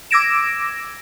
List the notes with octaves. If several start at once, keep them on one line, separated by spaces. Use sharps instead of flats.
D6 E6 G#6 A#6 D7 E7